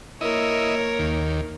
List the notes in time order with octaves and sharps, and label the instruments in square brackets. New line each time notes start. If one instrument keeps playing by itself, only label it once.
[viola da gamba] A#3 A#4 C#5 [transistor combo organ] E4 D#5
[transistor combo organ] D#2